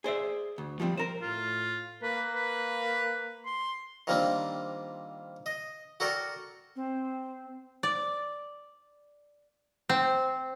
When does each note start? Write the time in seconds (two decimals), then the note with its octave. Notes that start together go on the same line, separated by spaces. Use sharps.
0.04 G#4 C5 D5 E5
0.58 D2
0.80 F3 G3 G#3 C4
0.97 A#4 C5
1.22 A2 F4
2.03 A#3 B4
2.35 B4
3.46 C6
4.07 D#3 F3 G3 A#3 C4 D4
5.46 D#5
6.00 F#4 A4 A#4 D5 G5
6.76 C4
7.83 D5
9.89 C4